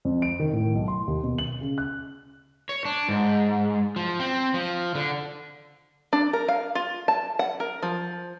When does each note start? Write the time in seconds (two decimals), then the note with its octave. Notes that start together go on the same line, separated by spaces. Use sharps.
0.05 F2
0.22 D7
0.40 D#3
0.53 A2
0.75 B1
0.88 C6
1.07 D#2
1.23 B2
1.38 F#7
1.61 C#3
1.78 F#6
2.69 C#5
2.85 D4
3.09 G#2
3.96 F3
4.20 C4
4.54 F3
4.95 D3
6.13 D4
6.33 A#4
6.48 F5
6.75 F4
7.08 A5
7.39 F#5
7.60 A#4
7.83 F3